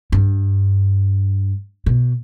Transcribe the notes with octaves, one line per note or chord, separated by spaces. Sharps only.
G2
B2